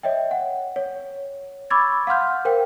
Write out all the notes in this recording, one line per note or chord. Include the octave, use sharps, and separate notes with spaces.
C#5 D#5 E5 G5
F#5
C#5
B5 C#6 D6 E6 G#6 A6
F5 F#5 C6 F6 G6
A#4 C5 F5 G5